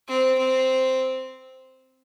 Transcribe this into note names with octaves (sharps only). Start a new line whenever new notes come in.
C4
C4